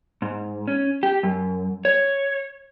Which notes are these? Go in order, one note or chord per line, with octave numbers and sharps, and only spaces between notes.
G#2
C#4
G4
F#2
C#5